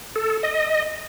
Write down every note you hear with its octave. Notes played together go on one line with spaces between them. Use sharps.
A4
D#5